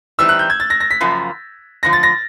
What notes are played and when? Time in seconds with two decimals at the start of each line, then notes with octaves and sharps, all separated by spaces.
0.19 E3 G3 C4 D#4 E6
0.29 F#6
0.39 G6
0.50 G#6
0.60 A6
0.70 A#6
0.80 A#6
0.91 B6
1.00 F#2 C#3 F3 A#3
1.83 F#2 D3 F3 A#6
1.93 A6
2.03 A#6